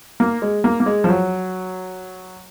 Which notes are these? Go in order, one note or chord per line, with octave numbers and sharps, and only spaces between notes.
A#3
G#3
A#3
A#3
G#3
F3
F#3